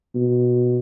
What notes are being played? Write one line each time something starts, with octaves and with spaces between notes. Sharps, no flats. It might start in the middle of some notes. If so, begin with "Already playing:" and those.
B2